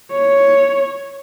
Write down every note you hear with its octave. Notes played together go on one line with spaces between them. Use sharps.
C#5